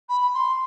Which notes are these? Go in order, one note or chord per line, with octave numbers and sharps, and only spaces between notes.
B5
C6